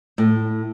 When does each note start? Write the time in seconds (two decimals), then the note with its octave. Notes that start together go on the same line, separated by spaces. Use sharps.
0.18 A2